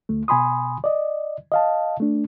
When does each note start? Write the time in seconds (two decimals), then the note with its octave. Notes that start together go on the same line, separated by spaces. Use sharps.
0.09 D2 A3
0.28 B2 G#5 B5 C6 D#6
0.84 D5 D#5
1.52 D#5 F5 A5
2.00 A3 D4